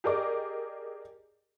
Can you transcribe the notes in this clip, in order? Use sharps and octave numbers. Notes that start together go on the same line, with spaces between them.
G4 G#4 A#4 D5 D#5 D6